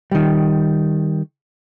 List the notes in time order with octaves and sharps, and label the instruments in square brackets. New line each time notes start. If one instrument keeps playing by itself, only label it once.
[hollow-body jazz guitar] D#3 G3